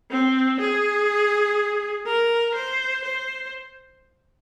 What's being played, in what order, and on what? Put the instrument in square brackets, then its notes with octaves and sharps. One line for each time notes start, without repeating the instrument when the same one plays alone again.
[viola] C4
G#4
A#4
C5
C5